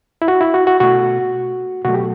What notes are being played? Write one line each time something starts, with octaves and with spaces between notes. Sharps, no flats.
E4
F#4
E4
F#4
F#4
B2 A3 F#4
B2 F#3 A3 F#4
G4